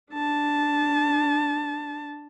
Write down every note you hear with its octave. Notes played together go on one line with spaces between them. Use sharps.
D4 A5